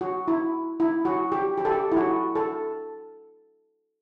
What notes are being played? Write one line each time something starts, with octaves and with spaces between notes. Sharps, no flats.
F#4
E4
E4
F#4
G4
G4
A4
G4
E4
F#4
A4